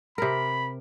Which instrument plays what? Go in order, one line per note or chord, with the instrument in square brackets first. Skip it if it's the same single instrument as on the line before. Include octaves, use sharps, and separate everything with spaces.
[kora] C3 A#4 [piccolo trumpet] B5